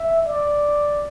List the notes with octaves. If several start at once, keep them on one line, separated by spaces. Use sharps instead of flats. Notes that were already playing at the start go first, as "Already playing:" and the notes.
Already playing: E5
D5